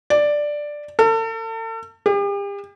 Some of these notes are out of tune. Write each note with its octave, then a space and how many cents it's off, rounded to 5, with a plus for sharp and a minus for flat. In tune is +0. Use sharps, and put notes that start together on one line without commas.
D5 +5
A4 +40
G4 +40